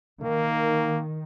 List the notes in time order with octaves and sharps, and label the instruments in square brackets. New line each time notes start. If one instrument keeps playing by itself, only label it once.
[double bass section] D#3 [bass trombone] A#3